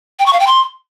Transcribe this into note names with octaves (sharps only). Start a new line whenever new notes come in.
G5
C#6
F5
G5
C6